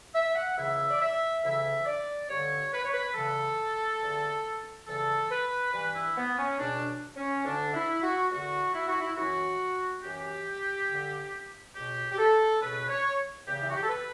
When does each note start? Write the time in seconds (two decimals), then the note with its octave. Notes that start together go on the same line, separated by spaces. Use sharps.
0.14 E5
0.35 F#5
0.57 C#2 C#3 E3 E5
0.89 D5
1.00 E5
1.43 D2 C#3 E3 E5
1.86 D5
2.29 G2 D3 C#5
2.72 B4
2.83 C#5
2.93 B4
3.14 E2 C#3 E3 A4
4.01 E2 D3
4.87 E2 C#3 E3 A4
5.30 B4
5.72 G2 E3 B4
5.94 E4
6.16 B3
6.37 C#4
6.58 C#2 B2 D4
7.15 C#4
7.45 D2 D3 D4
7.74 E4
8.02 F#4
8.30 E2 D3 F#4
8.74 E4
8.87 F#4
9.00 E4
9.16 F#2 E3 F#4
10.02 F#2 E3 G4
10.88 D3
10.93 G2
11.74 C#2 B2 G4
12.11 G4
12.18 A4
12.60 C#2 B2 B4
12.88 C#5
13.46 E2 C#3 E3 G4
13.61 E4
13.69 F#4
13.75 G4
13.82 A4
13.89 B4